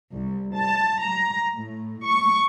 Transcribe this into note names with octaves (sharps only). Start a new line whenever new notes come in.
C2
A5
A#5
A2
C#6